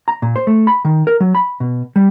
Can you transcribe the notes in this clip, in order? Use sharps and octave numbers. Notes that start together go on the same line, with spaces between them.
A#5
A#2
C5
A3
B5
D#3
A#4
F#3
B5
B2
G3